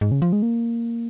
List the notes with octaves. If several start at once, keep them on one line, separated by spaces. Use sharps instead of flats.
G#2
C#3
F3
G#3
A#3